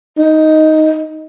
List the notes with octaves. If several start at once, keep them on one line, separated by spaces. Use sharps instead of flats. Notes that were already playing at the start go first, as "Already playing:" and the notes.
D#4